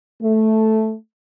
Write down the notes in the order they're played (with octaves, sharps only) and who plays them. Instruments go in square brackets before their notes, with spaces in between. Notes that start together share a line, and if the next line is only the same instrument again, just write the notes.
[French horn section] A3